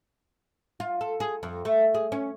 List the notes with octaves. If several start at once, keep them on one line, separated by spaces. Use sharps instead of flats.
F4
A4
G#4
F2
A3
G#4
C#4